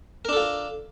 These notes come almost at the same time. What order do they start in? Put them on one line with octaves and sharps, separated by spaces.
A#4 D4 A4 F4